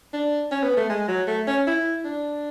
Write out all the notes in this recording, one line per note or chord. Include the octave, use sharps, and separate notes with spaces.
D4
C#4
B3
A3
G#3
F#3
A3
C#4
E4
D4